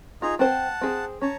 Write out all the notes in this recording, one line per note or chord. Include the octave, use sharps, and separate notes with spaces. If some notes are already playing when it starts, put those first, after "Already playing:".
D#4 F4 G#4 A#5
C4 C5 F#5 A5
C4 G#4
C#4 C#5 A5 A#5